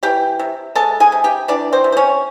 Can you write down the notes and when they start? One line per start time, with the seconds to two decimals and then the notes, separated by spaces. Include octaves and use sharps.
0.03 E3 G4 G5
0.39 C3
0.75 G#3 A4 A5
1.00 G#4 G#5
1.12 C3
1.24 G4 G5
1.48 E3 D4 D5
1.73 C4 C5
1.84 C3
1.92 C5
1.97 C#4 C#5